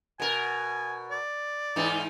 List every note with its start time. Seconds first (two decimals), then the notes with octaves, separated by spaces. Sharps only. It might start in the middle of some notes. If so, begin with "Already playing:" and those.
0.20 B2 A#4 G#5
1.11 D5
1.76 G#2 E3 D#4